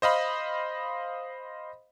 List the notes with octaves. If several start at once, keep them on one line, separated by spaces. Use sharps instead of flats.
C5 D#5 F5 B5